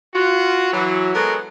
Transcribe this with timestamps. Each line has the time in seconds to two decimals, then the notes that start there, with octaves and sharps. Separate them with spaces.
0.14 F4 F#4
0.73 E3 F#3
1.14 F#3 G#3 B3 A4 A#4